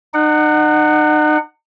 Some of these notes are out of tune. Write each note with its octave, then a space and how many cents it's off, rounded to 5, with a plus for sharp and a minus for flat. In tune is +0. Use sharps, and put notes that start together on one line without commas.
D#4 -40 F#5 +5